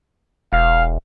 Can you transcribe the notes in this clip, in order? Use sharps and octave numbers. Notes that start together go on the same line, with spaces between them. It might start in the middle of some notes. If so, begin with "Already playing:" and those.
E1 F5